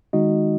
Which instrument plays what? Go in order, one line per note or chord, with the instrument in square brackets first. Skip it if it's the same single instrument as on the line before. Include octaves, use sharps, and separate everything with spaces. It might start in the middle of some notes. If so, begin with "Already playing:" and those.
[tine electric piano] D#3 G#3 D#4 F#4 D#5